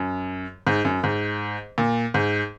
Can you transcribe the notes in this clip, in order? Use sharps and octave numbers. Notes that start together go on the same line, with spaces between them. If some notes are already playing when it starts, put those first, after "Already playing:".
Already playing: F#2
G#2
F#2
G#2
A#2
G#2